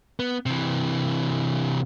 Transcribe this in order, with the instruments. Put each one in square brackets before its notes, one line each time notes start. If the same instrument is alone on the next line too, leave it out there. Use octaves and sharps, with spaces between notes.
[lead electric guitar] B3
C3 E3